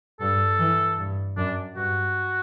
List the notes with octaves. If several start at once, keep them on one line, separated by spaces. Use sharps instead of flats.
G2 A4
E3
G2
F#2 D4
G2 F#4